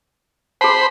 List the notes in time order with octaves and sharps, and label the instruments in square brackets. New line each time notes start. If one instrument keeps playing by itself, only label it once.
[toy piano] G#4 A5 [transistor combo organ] C5 B5